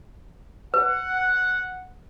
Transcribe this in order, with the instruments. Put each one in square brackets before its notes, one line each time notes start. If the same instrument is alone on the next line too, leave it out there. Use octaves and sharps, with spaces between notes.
[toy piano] B4 [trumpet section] F#5